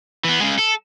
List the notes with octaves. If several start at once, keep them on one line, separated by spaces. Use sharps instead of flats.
E3 B3
C#3 G#3
A4